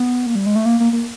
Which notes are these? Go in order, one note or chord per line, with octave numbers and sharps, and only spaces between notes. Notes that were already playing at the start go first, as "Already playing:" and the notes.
Already playing: B3
A#3
G3
G#3
A3
A#3
A#3
A#3